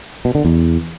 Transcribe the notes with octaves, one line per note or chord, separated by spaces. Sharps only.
B2
D3
E2